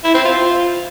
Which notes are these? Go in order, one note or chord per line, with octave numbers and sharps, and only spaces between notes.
E4
C4
F4